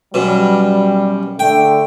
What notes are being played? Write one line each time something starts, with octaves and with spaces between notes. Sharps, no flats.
F#2 B2 G3
D3 A3 G5